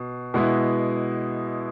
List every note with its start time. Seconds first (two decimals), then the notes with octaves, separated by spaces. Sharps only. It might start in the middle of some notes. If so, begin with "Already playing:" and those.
Already playing: B2
0.34 B2 G#3 B3 E4